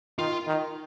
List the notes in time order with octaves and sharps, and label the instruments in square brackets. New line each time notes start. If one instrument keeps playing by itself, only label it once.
[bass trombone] D#3 [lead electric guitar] F4
[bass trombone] D#3